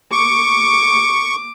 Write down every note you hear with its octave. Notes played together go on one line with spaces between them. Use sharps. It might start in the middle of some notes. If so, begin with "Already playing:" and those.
C#6 D6